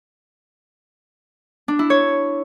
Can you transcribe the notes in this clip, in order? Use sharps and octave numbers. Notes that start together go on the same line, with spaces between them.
D4
E4
C#5